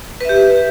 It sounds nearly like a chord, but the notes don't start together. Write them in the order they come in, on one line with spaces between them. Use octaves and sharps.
B4 E5 G4